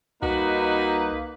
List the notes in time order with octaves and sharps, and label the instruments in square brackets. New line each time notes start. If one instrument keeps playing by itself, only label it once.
[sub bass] C2 [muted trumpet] A#3 [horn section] D#4 B4 [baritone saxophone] F#4